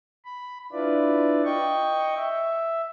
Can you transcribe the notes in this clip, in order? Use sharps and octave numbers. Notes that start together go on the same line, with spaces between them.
B5
D4 E4 F4 B4 D5
D#5 G5 C#6
E5